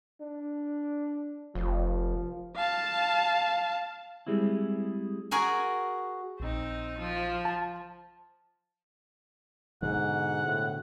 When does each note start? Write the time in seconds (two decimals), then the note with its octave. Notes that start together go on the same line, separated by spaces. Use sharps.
0.21 D4
1.55 F1 F3
2.56 F5 A5
4.27 G3 G#3 C4 E4
5.31 F#4 G#4 A#4 G#5
6.40 A#1 C4 D#4
6.98 F3
7.45 A5
9.83 G#2 B2 D3 F#5
10.45 A2